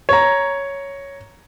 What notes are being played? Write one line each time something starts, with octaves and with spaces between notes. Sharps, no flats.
C#5 A#5